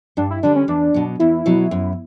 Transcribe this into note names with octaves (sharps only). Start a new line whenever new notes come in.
G2 D4
E4
D3 G3 D4
C#4
E2 D4
B2 F#3
E2 E4
B2 F#3
F#2